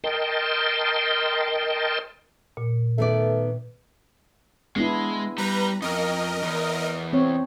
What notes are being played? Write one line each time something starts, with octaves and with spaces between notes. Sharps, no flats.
A#4 D#5 G5 A5 C6
A#2
D#3 A3 B3 D5
G#3 B3 D4 E4
G3 B4 A#5
F2 A#4 D#5
E2
C4 C#5